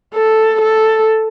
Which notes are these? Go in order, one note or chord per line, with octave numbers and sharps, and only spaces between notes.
A4
A4